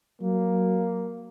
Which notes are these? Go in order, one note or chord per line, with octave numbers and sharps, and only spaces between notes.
F#3 A#3